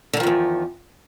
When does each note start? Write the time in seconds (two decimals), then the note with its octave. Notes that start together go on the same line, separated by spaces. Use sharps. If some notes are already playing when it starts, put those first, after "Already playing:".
0.13 D3
0.17 D#3
0.20 F3
0.23 G2
0.27 E2